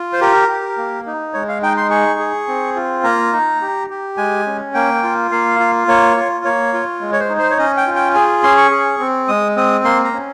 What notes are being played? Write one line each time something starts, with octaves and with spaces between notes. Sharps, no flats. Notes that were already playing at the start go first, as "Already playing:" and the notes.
Already playing: F4
C5
G4 A#4
G4
A#3
D#4
G#3 C#5
F5
D#4 G5
C6
G#4 C#6
G#4
C4
F4
A#3 A#5
D#4
G4
G4
G#3 G#5
C#4
A#3 G5
F4
A#3 F5
F4
A#3 C#5
F4
A#3 C#5
F4
G#3
C#5
C5
D#4
C5
C#5
C#4 D#5
G5
F4
G5
G#4 G#5
C#4 C6
C#6
G#4
C4
G#3 D#6
C4 D#6
A#3 C6
A#5
C#4